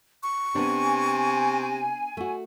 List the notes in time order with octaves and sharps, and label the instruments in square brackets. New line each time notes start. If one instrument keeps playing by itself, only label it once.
[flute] C#6
[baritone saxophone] C3 [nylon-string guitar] B3 D4 [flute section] G#5
[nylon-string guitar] A3 F#4